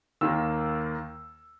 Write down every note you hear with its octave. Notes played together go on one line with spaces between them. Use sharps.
D#2 D#3 A#3 E6